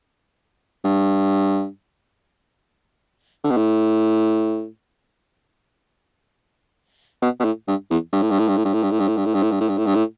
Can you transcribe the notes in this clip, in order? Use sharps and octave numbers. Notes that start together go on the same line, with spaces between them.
G2
D3
B2
A2
B2
B2
A2
G2
E2
G2
A2
G2
A2
G2
A2
G2
A2
G2
A2
G2
A2
G2
A2
G2
A2
G2
A2
G2
A2
G2
A2